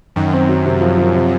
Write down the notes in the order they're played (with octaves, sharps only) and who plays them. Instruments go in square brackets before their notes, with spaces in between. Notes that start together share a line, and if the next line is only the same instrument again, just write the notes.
[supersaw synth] F#2 [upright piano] D#3
[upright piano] C4
F#3
C3
F3
F3
C3